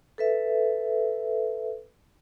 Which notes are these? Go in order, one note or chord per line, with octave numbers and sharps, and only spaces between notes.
A4 B4 E5